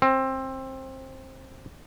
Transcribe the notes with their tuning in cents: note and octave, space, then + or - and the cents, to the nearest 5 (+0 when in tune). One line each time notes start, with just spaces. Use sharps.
C4 +20